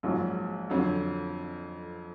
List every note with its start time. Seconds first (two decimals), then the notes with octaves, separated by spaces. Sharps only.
0.03 A#1 G#2 F#3
0.70 F2 D3 F#3